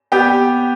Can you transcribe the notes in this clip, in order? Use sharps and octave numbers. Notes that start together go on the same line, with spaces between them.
B3 G4 G5